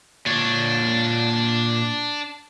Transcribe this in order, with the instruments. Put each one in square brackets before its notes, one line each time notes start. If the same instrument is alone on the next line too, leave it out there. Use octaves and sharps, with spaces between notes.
[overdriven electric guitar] A#2 C#5 [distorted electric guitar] D4